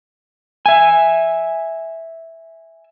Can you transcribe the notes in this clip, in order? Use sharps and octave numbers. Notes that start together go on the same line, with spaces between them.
E5 G#5